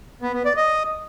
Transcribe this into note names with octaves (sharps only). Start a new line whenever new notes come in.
B3
B3
D5
D#5